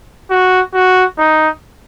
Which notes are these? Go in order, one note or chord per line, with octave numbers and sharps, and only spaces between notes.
F#4
F#4
D#4